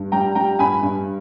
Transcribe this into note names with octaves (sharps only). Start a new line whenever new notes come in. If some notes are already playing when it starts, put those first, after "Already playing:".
Already playing: G2
G3 G5 A#5
G3 G5 A#5
G2 G#5 B5
G2